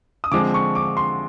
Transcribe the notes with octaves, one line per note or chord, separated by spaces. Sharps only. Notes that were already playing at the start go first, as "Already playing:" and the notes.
D#6
D3 F3 G#3 C4 D6
C#6
D6
C6